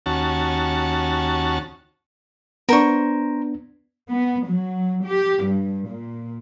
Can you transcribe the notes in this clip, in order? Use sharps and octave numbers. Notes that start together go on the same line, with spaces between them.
D#2 C#4 F#4 A5
B3 D4 A#4 C5 C#6
B3
F#3
G4
G2
A#2